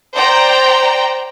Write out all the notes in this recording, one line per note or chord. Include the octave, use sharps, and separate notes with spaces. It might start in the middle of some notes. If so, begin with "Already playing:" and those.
C5 D5 G5 A#5